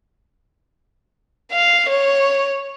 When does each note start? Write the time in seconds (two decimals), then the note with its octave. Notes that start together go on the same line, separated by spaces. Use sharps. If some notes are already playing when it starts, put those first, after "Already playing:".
1.52 F5
1.89 C#5